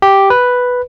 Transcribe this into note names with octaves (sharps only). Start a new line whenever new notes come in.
G4
B4